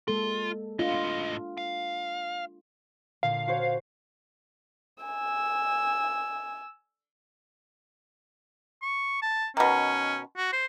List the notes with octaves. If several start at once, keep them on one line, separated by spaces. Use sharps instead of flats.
G#3 A#3 F4 A4
A2 D4 F4 D#5
F5
A#2 D3 F5
F#4 C5 C#5
G#5 E6
C#6
A5
B2 D#3 C#4
F#4
C5